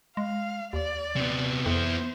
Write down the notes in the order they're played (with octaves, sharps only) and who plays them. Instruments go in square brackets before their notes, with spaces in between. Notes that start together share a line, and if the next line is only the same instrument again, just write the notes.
[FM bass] G#3 [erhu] F5
[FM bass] D#2 [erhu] D5
[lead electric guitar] C3 B3
[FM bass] F2 [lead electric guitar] B3 E4 [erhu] C5